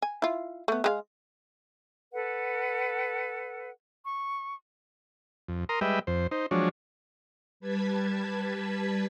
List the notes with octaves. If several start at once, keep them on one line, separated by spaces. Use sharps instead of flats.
G#5
E4 F4
A3 B3
G#3 G4 F5
A4 B4 F#5
C#6
F2
A#4 A#5 C6 D#6
G3 G#3 B4 D#5 E5 G5
F2 C5
D#4 C5
F3 F#3 G#3 D4 C#5
G3 B4 A5 G#6 B6